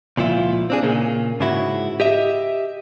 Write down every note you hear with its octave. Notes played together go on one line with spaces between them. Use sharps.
C#2 A#2 F3 E4 F4
C4 D4 G#4
A#2 C#3 A#3
G#2 C#3 E4 F#4
G4 D#5 E5